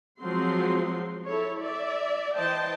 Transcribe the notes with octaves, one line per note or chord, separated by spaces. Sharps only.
F3 F#3 G#3 C4 F#4 C6
E4 A4 C#5
D5 E5
E3 C5 D#5 G5 A5